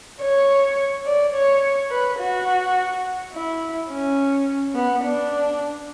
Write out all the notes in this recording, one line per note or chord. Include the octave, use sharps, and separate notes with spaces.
C#5
D5
C#5
B4
F#4
E4
C#4
B3
D4